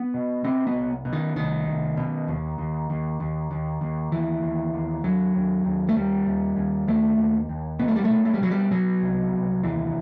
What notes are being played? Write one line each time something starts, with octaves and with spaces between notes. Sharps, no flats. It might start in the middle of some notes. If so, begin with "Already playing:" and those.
Already playing: B3
B2
B2 C4
B3
C2
B2
D#3
C2 D#3
C2
B2
D#2
D#2
D#2
D#2
D#2
D#2
D#2 E3
D#2
D#2
D#2 F#3
D#2
D#2
A3
D#2 G3
D#2
D#2
D#2 A3
D#2
D#2
B2 B3
A3
G3
A3
B2
A3
G3
B2 F#3
G3
B2 F#3
C2
C2
D#2 E3